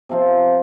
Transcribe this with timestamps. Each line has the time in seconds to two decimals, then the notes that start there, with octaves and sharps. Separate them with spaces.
0.09 C3 F3 C4 F4